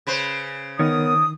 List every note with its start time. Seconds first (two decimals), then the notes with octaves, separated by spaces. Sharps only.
0.07 C#3 B4 C5
0.79 D#3 B3 A#4 C#5 D#6